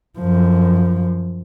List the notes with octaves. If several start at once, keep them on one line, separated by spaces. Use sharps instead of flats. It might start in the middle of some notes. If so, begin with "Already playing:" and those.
F#2 F3